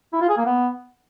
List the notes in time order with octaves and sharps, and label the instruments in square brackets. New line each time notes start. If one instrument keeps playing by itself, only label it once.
[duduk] E4
F4
G#4
A#3
B3